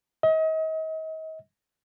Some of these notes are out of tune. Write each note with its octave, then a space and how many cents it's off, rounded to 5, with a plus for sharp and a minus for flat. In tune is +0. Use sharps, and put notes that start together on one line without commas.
D#5 +35